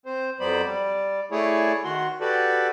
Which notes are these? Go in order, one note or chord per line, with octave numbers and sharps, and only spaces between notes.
C4 C5
F2 F#3 B3 C5 D5 B5
G3 D5
A3 E4 G#4 C#5 D5
D#3 F#4 C6
F#4 G4 A4 B4 D5